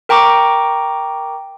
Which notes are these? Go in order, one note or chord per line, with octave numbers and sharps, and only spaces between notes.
A#4 G5 A#5 C#6 D6